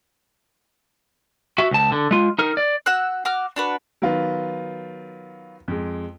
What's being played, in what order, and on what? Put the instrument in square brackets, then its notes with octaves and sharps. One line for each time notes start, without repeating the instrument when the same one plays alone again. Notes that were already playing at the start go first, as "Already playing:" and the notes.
[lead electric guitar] F#4 E5
C#2 A5
D3
G#3 F4
D#4 A#4
D5
[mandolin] F#4 E6 F#6
F#4 D6 F6
D4 F#4 B4
[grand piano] D#3 F#3 B3 F4
F2 G#3